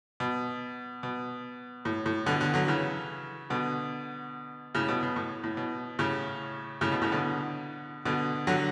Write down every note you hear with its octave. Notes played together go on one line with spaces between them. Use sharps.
B2
B2
A2
A2
B2 D3
B2 D3
D3 F#3
C#3 E3
B2 D3
A2 C#3
B2
B2
A2
A2
B2
A2 C#3
A2 C#3
B2
A2 C#3
B2 D3
B2 D3
D3 F#3